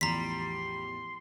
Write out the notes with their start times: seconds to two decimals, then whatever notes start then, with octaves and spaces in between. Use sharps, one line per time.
0.01 A1 E2 F3 G3 A#5 C6 B6